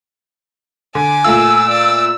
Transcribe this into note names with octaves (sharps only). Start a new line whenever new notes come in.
D3 G#5 D6
A#2 A3 F4 E6
D5